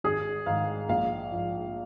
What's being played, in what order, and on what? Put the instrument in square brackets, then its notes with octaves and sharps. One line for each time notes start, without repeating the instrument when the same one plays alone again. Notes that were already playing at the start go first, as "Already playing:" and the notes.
[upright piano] G#1 G#4
G#2 D#3 F5
A#1 F5
G#2 F3